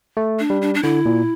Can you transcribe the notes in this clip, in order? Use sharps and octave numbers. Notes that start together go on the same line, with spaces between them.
A3
D4
G3
D4
D4
D3 E4
A#2